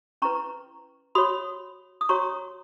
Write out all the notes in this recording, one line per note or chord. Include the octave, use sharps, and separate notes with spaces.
C#4 E4 B4 A#5 C#6
F#4 C#5 B5 D#6
D#6
F#4 C#5 A#5 C#6